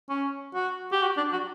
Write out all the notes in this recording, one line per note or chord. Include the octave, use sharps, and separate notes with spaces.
C#4
F#4
G4
F#4
D4
F#4